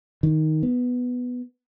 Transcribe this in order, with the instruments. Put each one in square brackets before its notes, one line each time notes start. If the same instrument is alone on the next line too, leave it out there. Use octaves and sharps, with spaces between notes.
[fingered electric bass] D#3
B3